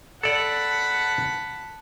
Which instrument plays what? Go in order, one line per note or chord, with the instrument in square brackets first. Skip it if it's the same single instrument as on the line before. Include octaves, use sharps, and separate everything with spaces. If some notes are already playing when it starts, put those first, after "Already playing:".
[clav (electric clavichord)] A4 D5 [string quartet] F#5 A5 B5